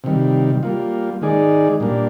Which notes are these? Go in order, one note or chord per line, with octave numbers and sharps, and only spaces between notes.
C3 D#3 G3
G3 A#3 F4
D#3 G#3 D#4 G#4 D5
A#2 G3 A#3 D4